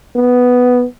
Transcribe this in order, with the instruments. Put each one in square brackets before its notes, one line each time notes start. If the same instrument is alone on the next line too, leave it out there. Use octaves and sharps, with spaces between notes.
[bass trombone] B3